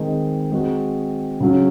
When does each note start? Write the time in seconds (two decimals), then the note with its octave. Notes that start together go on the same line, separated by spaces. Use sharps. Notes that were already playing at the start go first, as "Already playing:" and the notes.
Already playing: D#3 G#3 C4 D#4
0.52 G#3 C4 F#4
1.40 C#3 F#3 C#4